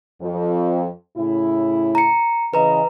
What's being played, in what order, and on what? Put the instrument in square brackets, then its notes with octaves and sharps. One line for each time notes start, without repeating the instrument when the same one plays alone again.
[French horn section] F2
A2 C#3 E4
[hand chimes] A#5 C#7
[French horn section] C#3 E3 D#5 [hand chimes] B4 A#5